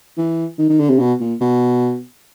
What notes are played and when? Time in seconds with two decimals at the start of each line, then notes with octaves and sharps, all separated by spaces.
0.17 E3
0.58 D#3
0.69 D#3
0.80 D3
0.90 C3
0.99 B2
1.20 A#2
1.40 B2